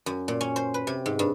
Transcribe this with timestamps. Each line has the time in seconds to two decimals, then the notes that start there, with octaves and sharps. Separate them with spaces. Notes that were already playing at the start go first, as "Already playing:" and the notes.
0.06 F#2
0.28 A#2
0.41 C#4
0.56 C5
0.74 B4
0.87 C3
1.06 G#2
1.19 G2